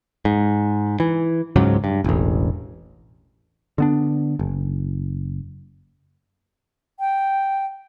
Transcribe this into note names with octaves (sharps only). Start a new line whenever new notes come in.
G#2
E3
C#2 G#2 C#3 F#3
G2
E1 A1
D3 B3 D4
F#1
G5